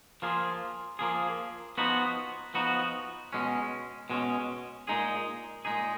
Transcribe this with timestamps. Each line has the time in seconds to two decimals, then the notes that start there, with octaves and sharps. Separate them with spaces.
0.22 F3 A#3 F4 G#4
0.99 F3 A#3 F4 G#4
1.78 F3 B3 D#4 F#4
2.54 F3 B3 D#4 F#4
3.33 B2 G#3 C#4
4.10 B2 G#3 C#4
4.87 A#2 G#3 D#4 G#4
5.65 A#2 G#3 D#4 G#4